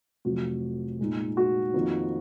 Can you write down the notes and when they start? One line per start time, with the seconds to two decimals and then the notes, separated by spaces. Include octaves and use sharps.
0.25 F1 F2 C3 F#3 F#4
1.00 A#2 G#3 D#4
1.37 F#4
1.74 F2 D#3 A#3 D#4